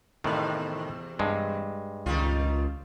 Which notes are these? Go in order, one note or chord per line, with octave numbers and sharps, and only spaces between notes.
E2 A2 C3 D#3
G2 G#3
C#2 D#3 G3 F4